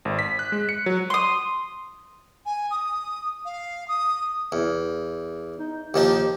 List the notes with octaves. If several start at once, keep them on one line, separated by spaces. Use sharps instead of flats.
G#1
B6
F#6
G#3
C#7
F#3
C6 D#6
G#5
D#6
F5
D#6
E2
D#4
D#2 F3 D#4 G4